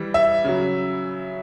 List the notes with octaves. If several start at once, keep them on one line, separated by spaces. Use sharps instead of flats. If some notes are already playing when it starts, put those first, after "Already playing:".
Already playing: E3 G3
E5
C#3 F#3